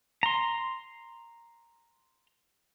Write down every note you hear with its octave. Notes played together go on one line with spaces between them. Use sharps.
A#5 C6